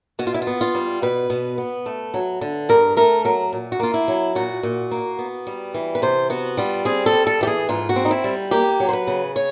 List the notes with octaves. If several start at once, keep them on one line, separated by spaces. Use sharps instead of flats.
B2 F#4
F4
E4
F4
B3
F4
G3
B2 B4
B2
B3
A3
F#3
D3
G2 A#4
A3 A#4
F#3 A#4
A#2
F#4
A#3 F4
E4
F#3
A#2 F#4
A#2
A#3
B3
G3
E3
B4
C3 C5
B3 F#4
G3 F4
C4 G#4
A4
G3
A4
E3 G4
G#4
G#2 F4
F#4
C4
D#4
E4
G3
A#3 G4
F#3
C5
B4
C#3
C#5